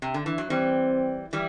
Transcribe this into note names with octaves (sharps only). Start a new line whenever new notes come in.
C3
D3
E3
F#3
E3 G3 C4
E3 G3